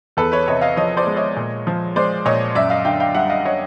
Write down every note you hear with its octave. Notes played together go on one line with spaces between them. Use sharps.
E2 A4 B4
B4 C#5
C3 C#5 D#5
D#5 F5
F3 C#5 D#5
C5 D5
G#3
C#5 D#5
A#2
F3
G#3 C5 D5
A#2 C#5 D#5
F#2 D5 E5
D#5 F5
D3 F5 G5
F5 G5
G3 E5 F#5
D#5 F5
C#5 D#5